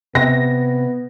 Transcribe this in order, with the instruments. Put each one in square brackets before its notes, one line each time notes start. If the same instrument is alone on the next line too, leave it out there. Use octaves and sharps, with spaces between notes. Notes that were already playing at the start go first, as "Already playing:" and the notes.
[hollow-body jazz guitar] C3 [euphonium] B3 [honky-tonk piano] A#6